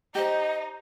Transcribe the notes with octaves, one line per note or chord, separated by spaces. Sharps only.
D#4 G4 C5 D#5